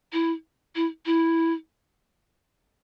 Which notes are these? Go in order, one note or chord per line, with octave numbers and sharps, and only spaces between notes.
E4
E4
E4